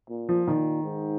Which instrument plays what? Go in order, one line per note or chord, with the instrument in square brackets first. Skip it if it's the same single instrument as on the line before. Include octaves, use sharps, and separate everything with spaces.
[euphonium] A#2
[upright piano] F3
[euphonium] A#2 [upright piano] D#3
[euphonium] G#2